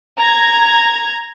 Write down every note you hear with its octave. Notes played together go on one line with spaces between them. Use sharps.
A#5 G#6